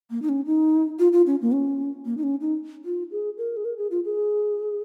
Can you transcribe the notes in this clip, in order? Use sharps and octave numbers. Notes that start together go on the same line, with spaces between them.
A#3
D#4
C#4
D#4
F4
F4
C#4
A#3
C#4
A#3
D#4
C#4
D#4
F4
G#4
A#4
G#4
A#4
G#4
F4
G#4